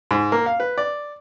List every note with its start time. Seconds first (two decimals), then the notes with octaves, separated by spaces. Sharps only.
0.11 G#2
0.32 A#3
0.46 F5
0.60 B4
0.78 D5